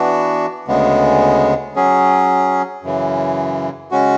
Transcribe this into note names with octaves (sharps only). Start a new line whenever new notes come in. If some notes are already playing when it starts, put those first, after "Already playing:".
Already playing: E3 B3 D4 F#4
D2 C#3 G#3 B3
F#3 C#4 G#4
F#2 C#3 E3
C#3 G#3 C#4 F#4